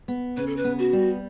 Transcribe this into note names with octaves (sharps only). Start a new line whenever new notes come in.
B3
C#3 B4
A4
B4
B3
F#4
G3